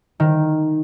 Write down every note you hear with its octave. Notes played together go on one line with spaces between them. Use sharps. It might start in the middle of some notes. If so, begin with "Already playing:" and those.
D#3